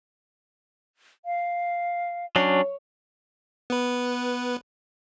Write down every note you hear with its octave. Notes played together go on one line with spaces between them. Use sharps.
F5
F#3 C#4 D4 C#5
B3 B4